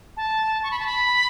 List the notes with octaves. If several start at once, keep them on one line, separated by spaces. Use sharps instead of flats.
A5
C#6
B5
A5
B5